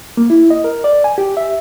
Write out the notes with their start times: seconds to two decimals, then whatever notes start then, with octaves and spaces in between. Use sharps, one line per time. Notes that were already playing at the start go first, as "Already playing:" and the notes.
0.17 A#3
0.30 E4
0.50 D#5
0.64 A#4
0.84 D5
1.04 G#5
1.18 G4
1.37 E5